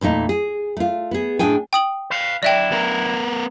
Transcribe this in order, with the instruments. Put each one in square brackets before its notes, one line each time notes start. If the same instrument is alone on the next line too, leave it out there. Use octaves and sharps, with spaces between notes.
[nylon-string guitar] E2 A#2 A3 D#4
G#4
A3 F4
B3 G#4
A2 D4 G#4 G5 G#5
[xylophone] G5 D#6 F#7
[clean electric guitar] B4 F5
[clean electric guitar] F#3 D4 E4 [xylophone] D5 E5 G5
[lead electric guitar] B3 A#4